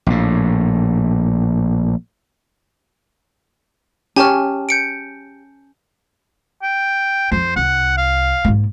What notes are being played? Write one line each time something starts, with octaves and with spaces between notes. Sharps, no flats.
A#1 A2
C#4 G4 C#5 G#5 A5 F6
G6 C#7 D7
G5
F2 C5
C2 F#5
F5
G#2 A#3